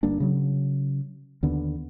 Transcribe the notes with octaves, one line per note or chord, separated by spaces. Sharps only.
G1 G2 A#3 D4
C#3 F#3
D#2 D3 B3